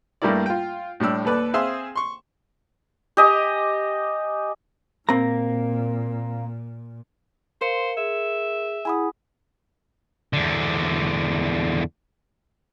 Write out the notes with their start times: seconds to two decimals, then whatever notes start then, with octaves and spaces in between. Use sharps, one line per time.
0.22 G2 G3 A3 A#3 E4 D5
0.46 F4 G5
1.00 A2 G3 D4 E6
1.25 D#2 A4 B4 D5
1.54 C4 G#4 E5 F5 C6
1.95 C6 C#6
3.17 G4 D#5 G#5
5.09 A#2 A#3 C4 A#5
7.61 A#4 C5 F5 C6 C#7
7.97 G#4 E5
8.85 E4 G#4 F#5 G#5 B5 D#6
10.33 E2 D3